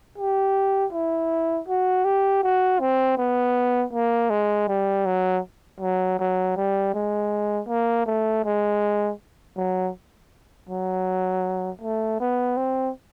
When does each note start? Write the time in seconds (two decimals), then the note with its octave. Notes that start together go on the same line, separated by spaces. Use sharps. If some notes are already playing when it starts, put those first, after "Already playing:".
0.18 G4
0.93 E4
1.69 F#4
2.05 G4
2.43 F#4
2.80 C4
3.18 B3
3.93 A#3
4.30 G#3
4.69 G3
5.06 F#3
5.81 F#3
6.20 F#3
6.57 G3
6.94 G#3
7.69 A#3
8.06 A3
8.45 G#3
9.57 F#3
10.69 F#3
11.82 A3
12.20 B3
12.57 C4